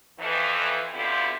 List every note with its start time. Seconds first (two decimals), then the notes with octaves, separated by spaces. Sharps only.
0.19 F2 E3
0.94 B2 D3 C4 E4 F4 G4